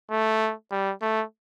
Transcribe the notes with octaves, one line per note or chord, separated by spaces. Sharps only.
A3
G3
A3